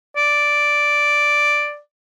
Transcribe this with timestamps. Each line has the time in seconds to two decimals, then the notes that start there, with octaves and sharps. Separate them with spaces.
0.16 D5